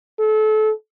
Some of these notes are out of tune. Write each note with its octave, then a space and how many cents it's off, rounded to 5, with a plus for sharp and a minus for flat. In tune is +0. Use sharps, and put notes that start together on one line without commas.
A4 -30